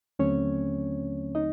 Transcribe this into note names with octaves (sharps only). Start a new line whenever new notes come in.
D#2 D3 F#3 A3 C4 C#4 C#5
D#4 D#5